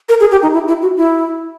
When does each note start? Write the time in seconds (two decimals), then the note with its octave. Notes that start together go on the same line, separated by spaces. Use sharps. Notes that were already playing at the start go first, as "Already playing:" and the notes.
0.09 A#4
0.20 G#4
0.32 G4
0.42 D#4
0.53 E4
0.68 E4
0.82 F#4
0.97 E4